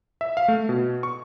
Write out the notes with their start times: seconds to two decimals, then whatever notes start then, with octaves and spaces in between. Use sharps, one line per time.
0.21 E5
0.37 F5
0.48 A3
0.69 B2
1.03 C#6